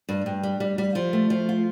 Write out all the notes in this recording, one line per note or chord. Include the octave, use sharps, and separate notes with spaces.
G2
G2
G3
G3
G3
F3
A3
F3
F4